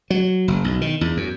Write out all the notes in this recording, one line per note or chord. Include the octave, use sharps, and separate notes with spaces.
F#3
F#1
B1
D#3
E2
F#2